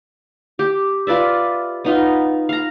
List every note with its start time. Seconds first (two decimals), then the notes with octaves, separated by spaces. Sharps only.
0.59 G4
1.07 F4 B4 D5 E5
1.85 B3 D#4 F4
2.49 F5 A#5